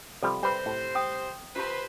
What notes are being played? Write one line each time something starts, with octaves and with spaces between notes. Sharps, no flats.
C3 F3 G3 A4 B5
C3 G3 B4 C5
A2
G5 D#6
F4 G4 B4 C5 A5